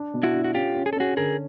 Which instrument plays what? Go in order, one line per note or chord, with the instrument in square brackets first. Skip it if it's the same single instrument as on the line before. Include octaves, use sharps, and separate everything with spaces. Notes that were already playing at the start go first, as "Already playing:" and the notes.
Already playing: [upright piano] D4
B2
[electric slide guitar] E4 F#4
[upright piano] D4
[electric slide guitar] F#4
[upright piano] C#4 [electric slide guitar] F4 G4
[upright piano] C#4
[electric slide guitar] G#4
A4
[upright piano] C#4 [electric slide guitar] F#4 G#4
[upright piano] D3 [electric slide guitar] G#4 A#4